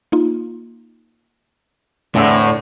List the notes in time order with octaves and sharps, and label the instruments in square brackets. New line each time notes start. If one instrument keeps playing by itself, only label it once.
[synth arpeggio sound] A#3 D#4 F4
[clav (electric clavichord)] E2 A3 C4 [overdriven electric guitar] A2 [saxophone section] D3